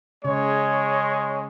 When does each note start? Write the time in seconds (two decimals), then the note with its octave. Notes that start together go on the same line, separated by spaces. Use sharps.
0.25 C#3 G#3 C#5